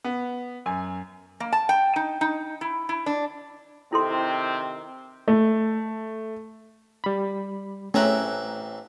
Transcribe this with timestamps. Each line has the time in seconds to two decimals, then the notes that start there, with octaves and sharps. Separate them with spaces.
0.04 B3
0.66 F#2 G#5
1.40 A#3
1.52 A5
1.69 G5
1.96 D#4
2.21 D#4
2.61 E4
2.89 E4
3.06 D4
3.93 C3 D#3 C4 E4 A4 C6
5.28 A3
7.04 G3 B5
7.94 A1 A3 C4 C#4 E5 G#5 A#5 F#6